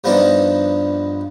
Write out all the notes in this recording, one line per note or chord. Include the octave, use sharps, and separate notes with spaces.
G2 F3 B3 D4 D#4